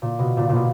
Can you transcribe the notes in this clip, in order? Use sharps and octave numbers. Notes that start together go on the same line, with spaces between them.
A#2
B2
A#2
A#2
B2